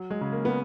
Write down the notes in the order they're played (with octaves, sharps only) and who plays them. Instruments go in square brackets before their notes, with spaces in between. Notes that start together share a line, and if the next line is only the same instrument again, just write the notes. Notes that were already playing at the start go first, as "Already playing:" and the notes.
Already playing: [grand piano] F#3
G#3
C#3
A#3
B3